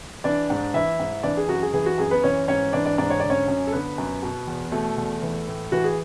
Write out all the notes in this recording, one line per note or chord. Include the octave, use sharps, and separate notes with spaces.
E3 D4 D5
G#2
E3 E4 E5
G#2
E3 D4 D5
G#4
F#2 F#4
G#4
E3 G#4
F#4
F#2 G#4
B3 B4
E3 C#4 C#5
G#2 C#4 C#5
E3 D4 D5
D4 D5
G#2 D4 D5
C#5
D3 D5
C#4 C#5
F#2
A4
D3 B3 B4
F#2
B2
E2
B2 A3 A4
E2
E3
A2
E3 F#4
G#4